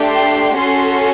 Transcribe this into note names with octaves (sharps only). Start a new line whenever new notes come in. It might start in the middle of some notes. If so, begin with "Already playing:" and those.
Already playing: A3 D4 G4
C6
C#4 F#4 A4 C6